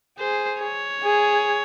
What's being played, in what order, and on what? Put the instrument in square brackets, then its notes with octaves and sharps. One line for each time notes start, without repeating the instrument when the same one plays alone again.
[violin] G#4 [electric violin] C5
[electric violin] C#5
[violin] G#4